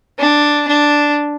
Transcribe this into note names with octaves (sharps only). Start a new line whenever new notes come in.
D4
D4